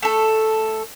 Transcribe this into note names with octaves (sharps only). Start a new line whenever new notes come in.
A3 A4